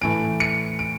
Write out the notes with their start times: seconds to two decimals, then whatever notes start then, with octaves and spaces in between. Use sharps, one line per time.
0.01 A2 E3 A3 D7
0.40 C#7
0.79 D7